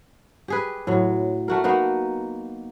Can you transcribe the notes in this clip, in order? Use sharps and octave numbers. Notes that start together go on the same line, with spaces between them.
G4 G#4 B4
A2 F#3
A3 F#4 A#4
A#3 B3 D#4 F#4